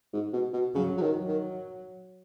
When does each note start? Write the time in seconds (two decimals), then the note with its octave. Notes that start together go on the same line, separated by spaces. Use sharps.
0.14 G#2
0.33 B2
0.54 B2
0.75 C#3 F#3
0.97 F#3
1.02 D#3
1.14 F#3
1.28 D#3